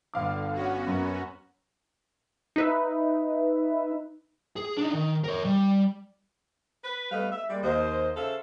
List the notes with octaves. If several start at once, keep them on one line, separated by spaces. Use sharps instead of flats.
G1 D3 F5 D6
B3 C#4 F#4
F#2
D#4 B4 E5
G#4
D4 D#4
D#3
A#4 C#5
G3
B4
G3 A3 B3 B4 D#5 F5
E5
G3 G#3 A#3 D5
D#2 C5 D#5
C#3 A4 C5 E5 F5